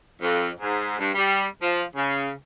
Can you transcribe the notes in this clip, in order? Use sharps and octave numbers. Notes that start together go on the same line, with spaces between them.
F2
G#2
G2
G3
F3
C#3